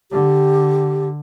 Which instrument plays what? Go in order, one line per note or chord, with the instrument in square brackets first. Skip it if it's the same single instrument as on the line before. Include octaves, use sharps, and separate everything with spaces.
[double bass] D3 [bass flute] G4